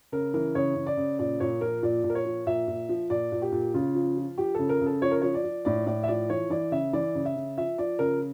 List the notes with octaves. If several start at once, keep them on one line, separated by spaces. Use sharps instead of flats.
C#3 A#4
E3 A#4
C#3 C#5
C#3
D5
C#3
A#2 D5
A#2 C#5
F3 A#4
A#2 D5
A#2
A#4
C#5
F3
A#2 E5
A#2
F3
A#2 D5
A#2
G4
A#2
C#3 F4
F3
F3
F3 G4
C#3 A4
A#4
C#3
A4
F3 C#5
A#4
F3 C#5
D5
F3
A2 D5
A2 D5
E5
F3 D5
E3 C#5
E3 D5
C#3 E5
E3 D5
C#3
E5
C#3
F3 E5
F3 D5
C#3 A#4